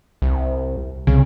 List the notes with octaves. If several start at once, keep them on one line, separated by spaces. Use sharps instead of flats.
C2
C2 C#3